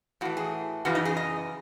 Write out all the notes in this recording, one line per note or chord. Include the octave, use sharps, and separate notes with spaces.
A2 E3 F#4
G#4
F#2 C#3 E3 F#4
D#4
G#4
D#5